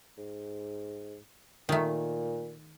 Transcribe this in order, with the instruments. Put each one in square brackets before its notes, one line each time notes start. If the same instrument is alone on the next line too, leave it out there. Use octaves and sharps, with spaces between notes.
[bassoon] G#2
[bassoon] A#2 [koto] D#3 A3